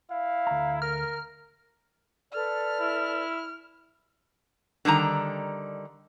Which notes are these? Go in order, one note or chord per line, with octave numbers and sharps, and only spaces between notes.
E4 F5
D2 A#5
A#4 F6
A4 B4 D5 F6
E4
D3 D#3 G3 A#5